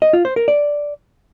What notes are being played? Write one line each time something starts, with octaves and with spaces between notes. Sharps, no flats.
D#5
F4
C5
A#4
D5